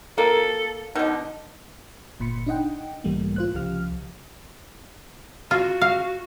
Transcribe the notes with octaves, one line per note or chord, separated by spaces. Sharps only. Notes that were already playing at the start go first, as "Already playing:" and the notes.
A#3 A4
B2 D3 D#4
G1 A#2 B5 C6 C#7
D4 D#4 D#5 F#5 G5
B1 G#2 E3 G3 A3 A#3
F4 C5 F#6
C2 C#3 F3 G4 F5 F6
F4 F#4
F5